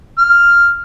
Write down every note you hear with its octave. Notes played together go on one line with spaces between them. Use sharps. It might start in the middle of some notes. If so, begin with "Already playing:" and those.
F6